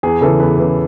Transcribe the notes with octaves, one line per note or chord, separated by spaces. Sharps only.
E2 G#4
C#3 E3 A4
E2 B4
C#3 E3